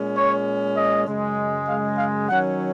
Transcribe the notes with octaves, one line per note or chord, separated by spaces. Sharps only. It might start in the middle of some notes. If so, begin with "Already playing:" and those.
Already playing: A#2 G#3 C#4
C#5
D#5
F#2 C#3 G#3
F5
F5
D#3 F#3 C#4 F#5